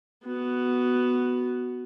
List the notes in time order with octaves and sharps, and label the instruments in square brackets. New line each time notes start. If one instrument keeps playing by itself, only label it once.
[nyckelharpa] B3 F#4